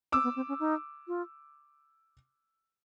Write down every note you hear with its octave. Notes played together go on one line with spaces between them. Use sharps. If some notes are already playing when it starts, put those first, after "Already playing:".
C4 D6 E6
B3
C4
C#4
D#4
F4